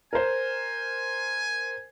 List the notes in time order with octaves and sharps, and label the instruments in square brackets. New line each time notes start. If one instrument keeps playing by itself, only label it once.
[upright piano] A#4 C5 [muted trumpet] G#5